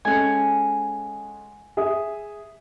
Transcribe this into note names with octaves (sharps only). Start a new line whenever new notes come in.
G#3 C#4 A4 F#5 G#5
G#4 E5 D#6